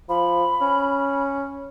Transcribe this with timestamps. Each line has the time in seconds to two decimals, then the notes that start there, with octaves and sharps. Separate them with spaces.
0.09 F3 B5
0.61 C#4